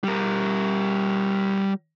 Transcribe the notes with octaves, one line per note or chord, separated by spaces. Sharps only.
G3 A#4